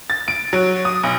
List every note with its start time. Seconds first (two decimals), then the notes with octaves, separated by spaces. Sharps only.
0.10 A6
0.28 D7
0.53 F#3
0.85 D#6
1.03 B1